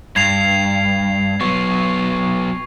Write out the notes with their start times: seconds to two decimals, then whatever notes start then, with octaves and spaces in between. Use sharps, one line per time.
0.16 G2 G#6 C7 F7
1.41 F#3 B3 C#6